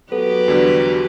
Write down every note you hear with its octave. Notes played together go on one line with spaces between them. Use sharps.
F#3 B3 G4 A4 B4
E2 D3 G3 F#4